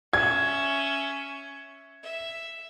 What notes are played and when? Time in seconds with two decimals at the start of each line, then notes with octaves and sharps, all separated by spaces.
0.13 C#4 E5 G#6
2.03 E5